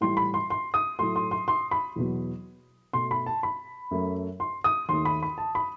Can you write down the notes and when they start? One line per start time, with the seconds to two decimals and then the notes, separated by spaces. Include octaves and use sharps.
0.01 A2 E3 G3 C6
0.17 B5
0.34 C6
0.50 C6
0.74 D#6
0.99 A2 F#3 A3 C6
1.16 C6
1.31 C6
1.48 C6
1.71 B5
1.96 E2 B2 F#3 B3
2.93 B2 A3 C6
3.11 B5
3.26 A5
3.43 B5
3.91 F#2 F#3 A3
4.40 C6
4.64 D#6
4.89 D#2 D#3 A3 C6
5.05 B5
5.23 B5
5.38 A5
5.55 B5